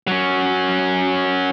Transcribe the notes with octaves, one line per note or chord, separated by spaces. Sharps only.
F#3 C#4